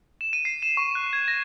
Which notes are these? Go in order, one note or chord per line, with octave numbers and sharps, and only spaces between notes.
E7
D#7
C7
E7
C#6
F#6
G#6
A#6